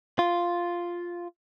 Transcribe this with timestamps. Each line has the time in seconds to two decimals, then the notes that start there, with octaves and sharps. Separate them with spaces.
0.19 F4